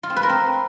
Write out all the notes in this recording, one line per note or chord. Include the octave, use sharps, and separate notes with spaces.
F4
C4
B4
A#4
C4